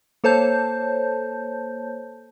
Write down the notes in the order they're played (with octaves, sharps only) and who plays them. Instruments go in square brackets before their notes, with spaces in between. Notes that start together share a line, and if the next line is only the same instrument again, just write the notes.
[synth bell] A#3 A4 C5 C#5 A5 G6